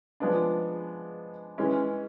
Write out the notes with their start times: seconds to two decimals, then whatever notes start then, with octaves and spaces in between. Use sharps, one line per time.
0.20 F3 G#3 B3 D4
1.58 E3 G#3 C#4